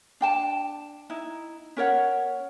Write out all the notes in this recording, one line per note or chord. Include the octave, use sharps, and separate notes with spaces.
D4 G5 A5
D#4 E4
C#4 A#4 C#5 F#5